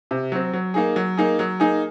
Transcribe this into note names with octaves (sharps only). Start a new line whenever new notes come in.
C3
F#3 C4
F#3
A#3 D#4 G#4
F#3
A#3 D#4 G#4
F#3
A#3 D#4 G#4